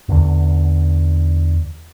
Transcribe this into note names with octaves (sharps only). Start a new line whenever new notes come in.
E2 D3